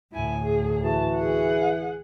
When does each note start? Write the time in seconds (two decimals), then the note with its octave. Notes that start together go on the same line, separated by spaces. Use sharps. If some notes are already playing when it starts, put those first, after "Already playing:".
0.13 D2 A2 E4 G#5
0.43 G#4
0.84 E3 F#4 A5
1.16 G#4 F#5